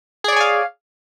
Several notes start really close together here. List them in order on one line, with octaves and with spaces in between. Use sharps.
G#4 D5 C#5 G#5 F5